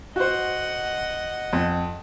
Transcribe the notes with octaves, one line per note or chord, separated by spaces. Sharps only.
F#4 C5 D#5 F#5
F2